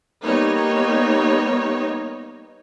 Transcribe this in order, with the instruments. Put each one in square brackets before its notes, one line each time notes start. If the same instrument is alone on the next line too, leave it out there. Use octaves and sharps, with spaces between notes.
[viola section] G3 A#3 B3 D#4 C#5